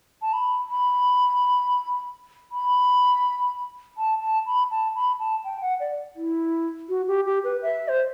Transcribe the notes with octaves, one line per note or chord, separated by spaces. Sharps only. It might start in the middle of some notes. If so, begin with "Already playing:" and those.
A5
B5
B5
B5
A5
A5
B5
A5
B5
A5
G5
F#5
D5
E4
F#4
G4
G4
B4
E5
C5